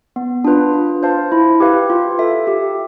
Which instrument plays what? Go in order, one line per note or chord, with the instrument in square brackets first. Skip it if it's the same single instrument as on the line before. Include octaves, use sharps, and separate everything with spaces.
[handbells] B3
D4 F4 B4
F4
C5 F5 A5
E4
G4 B4 F5
F4
A4 E5
G4